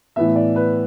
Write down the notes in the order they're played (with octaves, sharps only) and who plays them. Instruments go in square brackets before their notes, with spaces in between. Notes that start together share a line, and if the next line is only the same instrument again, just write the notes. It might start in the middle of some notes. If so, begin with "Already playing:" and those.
[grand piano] A2 E3 B3 E5
D5
B4